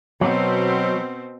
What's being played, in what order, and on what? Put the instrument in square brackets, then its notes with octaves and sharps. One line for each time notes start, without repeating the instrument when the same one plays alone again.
[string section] B2 C4 [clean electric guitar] F#3